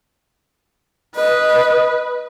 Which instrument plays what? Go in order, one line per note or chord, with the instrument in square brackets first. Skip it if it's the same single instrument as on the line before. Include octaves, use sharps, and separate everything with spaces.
[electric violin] B4 [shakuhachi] D#5